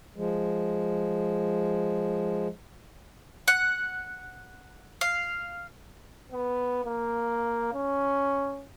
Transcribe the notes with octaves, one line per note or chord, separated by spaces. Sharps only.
F3 G#3
F#5
F5
B3
A#3
C#4